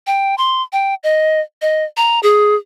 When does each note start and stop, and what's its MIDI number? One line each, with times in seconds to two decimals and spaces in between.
0.07 0.35 79
0.38 0.63 84
0.73 0.95 79
1.03 1.40 75
1.62 1.84 75
1.97 2.20 82
2.23 2.56 68